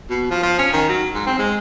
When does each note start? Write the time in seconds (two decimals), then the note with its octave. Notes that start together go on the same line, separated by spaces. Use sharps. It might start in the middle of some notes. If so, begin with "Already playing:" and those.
0.10 B2
0.31 F3
0.43 F3
0.59 C#4
0.73 D#3
0.89 F#3
1.14 G#2
1.27 C4
1.39 G#3